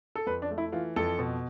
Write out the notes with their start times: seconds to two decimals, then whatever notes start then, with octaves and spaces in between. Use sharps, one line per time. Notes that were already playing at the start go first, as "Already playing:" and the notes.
0.16 A4
0.26 F2 B4
0.42 D4
0.50 A3
0.58 E4
0.72 E3 F4
0.96 F2 A4
1.19 B2